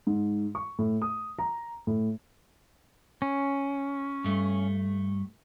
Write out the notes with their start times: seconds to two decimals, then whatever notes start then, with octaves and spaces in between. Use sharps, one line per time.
0.07 G#2
0.55 C#6
0.79 A2
1.02 D#6
1.39 A#5
1.87 A2
3.22 C#4
4.24 G2 A3